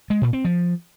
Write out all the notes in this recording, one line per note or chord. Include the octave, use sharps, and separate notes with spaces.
G#3
A#2
C4
F3